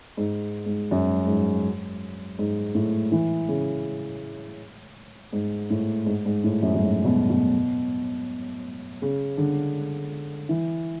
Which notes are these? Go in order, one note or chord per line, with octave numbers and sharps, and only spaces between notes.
G#2
G#2
F#2
G#2
G#2
A2
E3
C#3
G#2
A2
G#2
G#2
A2
F#2
F#2
G#2
B2
B2
C#3
D3
E3